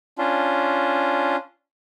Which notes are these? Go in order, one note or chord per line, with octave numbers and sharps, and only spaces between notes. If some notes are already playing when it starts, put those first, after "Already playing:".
C#4 D4 F4